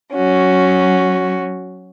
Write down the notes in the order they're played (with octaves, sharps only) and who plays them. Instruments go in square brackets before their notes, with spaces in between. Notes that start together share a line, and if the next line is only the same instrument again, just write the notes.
[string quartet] F#3 C#4 F#4